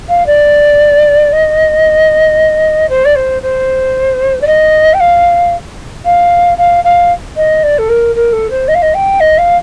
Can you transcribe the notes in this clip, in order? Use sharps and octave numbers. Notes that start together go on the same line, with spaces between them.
F5
D5
D#5
C5
D5
C5
C5
D5
D#5
G5
F5
F5
F5
F5
D#5
D5
A4
A#4
A#4
A4
C5
D#5
F5
D#5
G5
D#5
F5